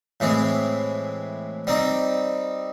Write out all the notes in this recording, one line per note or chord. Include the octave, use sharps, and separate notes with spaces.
A2 E3 G#3 C4
G3 C4 D#4